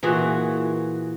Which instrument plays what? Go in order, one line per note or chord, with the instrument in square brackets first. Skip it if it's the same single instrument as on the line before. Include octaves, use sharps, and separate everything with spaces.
[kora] A#2 E3 F#4 G#4